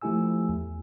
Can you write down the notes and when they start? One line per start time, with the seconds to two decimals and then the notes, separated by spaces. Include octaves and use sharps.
0.01 F3 A3 E4 G4 G#5 E6
0.49 E2